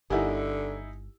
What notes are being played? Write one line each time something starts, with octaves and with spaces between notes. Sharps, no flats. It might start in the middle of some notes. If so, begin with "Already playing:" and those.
G1 D3 D#4 E4 G4 A#4 F#5 G#5